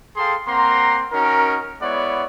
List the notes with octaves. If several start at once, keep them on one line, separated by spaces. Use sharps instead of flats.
G#4 A4 F5 G5 C6
A#3 C4 F#5 A#5 C6
C#4 D#4 F#4 A#4
G#3 B3 E4 C#5 D5 F#5